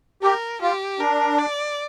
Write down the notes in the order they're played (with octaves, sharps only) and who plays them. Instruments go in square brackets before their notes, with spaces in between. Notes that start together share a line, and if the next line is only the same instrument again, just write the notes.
[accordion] G4 [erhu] A#4
[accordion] F4 [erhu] G4
[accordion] D4 [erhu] A#4
[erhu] D5